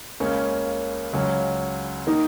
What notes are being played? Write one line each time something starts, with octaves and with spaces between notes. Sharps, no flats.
C#2 C#3 A#3 C#4
C#2 C#3 F#3 C#4
D#3 A#3 D#4